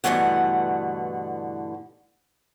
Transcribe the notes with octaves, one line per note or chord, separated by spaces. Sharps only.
G2 B2 D3 E3 A3 F#5